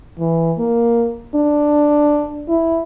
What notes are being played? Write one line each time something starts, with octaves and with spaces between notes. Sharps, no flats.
E3
A#3
D4
E4